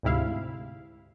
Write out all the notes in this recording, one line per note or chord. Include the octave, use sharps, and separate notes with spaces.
D2 G#2 C3 E4 F5